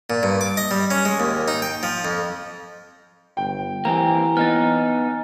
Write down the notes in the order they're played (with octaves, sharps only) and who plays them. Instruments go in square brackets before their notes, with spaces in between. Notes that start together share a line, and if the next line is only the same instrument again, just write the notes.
[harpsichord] A#2
G2
D6
D#5
G3
C#4
G#3
D#2
D#4
G5
F3
F2
[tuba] G1 [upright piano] G5
[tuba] E3 [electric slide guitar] A#3 C4 G4 [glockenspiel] G#5 A#5
[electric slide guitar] B3 D#4 [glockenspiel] F6 A6